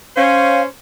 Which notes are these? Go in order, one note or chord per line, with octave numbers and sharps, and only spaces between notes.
C#4 C5 F5